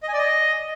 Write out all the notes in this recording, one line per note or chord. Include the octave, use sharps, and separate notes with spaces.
D#5
G#5
D5
D#5